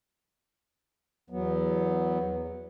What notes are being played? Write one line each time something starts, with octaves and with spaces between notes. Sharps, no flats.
E2 F#3 B3